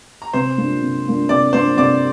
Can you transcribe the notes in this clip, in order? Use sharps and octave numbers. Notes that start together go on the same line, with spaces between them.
A#5
C3 C5 C6
A#3 D4 F4
C3
A#3 D4 F4
C3 D5 D6
A#3 D4 F4 C5 C6
C3 D5 D6